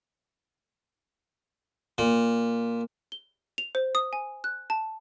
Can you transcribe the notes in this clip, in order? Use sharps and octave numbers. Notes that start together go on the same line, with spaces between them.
A#2
G7
F7
C5
D#6
G#5
F#6
A5